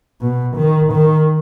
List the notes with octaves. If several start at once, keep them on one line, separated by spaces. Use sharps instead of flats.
B2
D#3
D#3